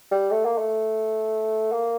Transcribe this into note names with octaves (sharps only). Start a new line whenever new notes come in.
G3
A3
A#3
A3
A#3